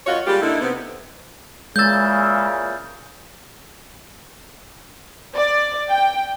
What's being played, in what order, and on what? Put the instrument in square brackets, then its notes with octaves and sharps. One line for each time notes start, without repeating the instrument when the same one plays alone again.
[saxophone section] F#2 F4 F#4 C#5 D#5 F5
G3 G#3 A#3 F4 G4
D3 A#3 D#4 E4
C3 B3
[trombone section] A#2 C#3 E3 [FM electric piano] G#3 E6 [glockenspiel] G6 A6
[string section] D5
G5